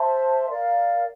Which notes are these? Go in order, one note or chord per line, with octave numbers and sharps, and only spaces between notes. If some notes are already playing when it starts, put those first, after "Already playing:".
Already playing: C5 E5 A5 C6
A#4 D5 F5